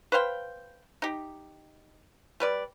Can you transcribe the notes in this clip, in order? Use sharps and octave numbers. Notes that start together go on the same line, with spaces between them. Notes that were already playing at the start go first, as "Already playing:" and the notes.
B4 C5 F5 G5
D#4 G4
G3 B4 D5